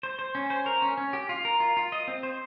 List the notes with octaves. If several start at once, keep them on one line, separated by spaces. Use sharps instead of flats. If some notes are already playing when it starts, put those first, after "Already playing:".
C5
C5
C#4
C5
A#4
C#4
C#4
G4
F4
A#4
F4
F4
D#5
C4
C5